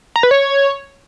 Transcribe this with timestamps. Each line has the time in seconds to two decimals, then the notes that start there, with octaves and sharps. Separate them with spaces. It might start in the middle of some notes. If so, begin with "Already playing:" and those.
0.16 A#5
0.23 B4
0.31 C#5